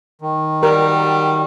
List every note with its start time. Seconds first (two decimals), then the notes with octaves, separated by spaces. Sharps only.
0.21 D#3
0.63 F#3 G3 A#4